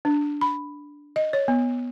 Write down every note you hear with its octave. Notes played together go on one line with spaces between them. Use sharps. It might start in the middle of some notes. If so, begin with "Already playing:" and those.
D4
B5
D#5
C#5
B3